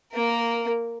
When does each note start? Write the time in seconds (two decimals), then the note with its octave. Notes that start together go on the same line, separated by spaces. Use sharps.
0.13 A#3 A#4